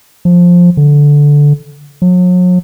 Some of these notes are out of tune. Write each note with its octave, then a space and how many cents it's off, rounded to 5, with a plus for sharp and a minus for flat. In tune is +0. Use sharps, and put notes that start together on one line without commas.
F3 +10
D3 -10
F#3 -40